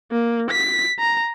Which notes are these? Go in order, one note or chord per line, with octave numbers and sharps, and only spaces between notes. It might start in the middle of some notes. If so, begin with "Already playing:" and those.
A#3
B6
A#5